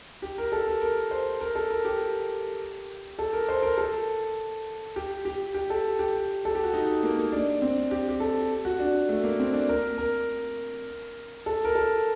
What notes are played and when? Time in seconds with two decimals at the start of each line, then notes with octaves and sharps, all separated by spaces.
0.22 G4
0.38 A#4
0.52 A4
0.67 A#4
0.81 A#4
1.11 C5
1.41 A#4
1.55 A4
1.71 A#4
1.85 G4
3.19 A4
3.33 A#4
3.48 C5
3.62 A#4
3.78 A4
4.96 G4
5.25 G4
5.54 G4
5.70 A4
5.99 G4
6.45 A4
6.55 G4
6.64 F#4
6.73 D#4
7.03 A#3
7.17 A#3
7.32 D4
7.62 C4
7.91 G4
8.09 G4
8.20 A4
8.65 F#4
8.80 D4
9.09 A3
9.24 A#3
9.39 C4
9.53 D4
9.69 A#4
9.98 A#4
11.46 A4
11.65 A#4
11.75 A4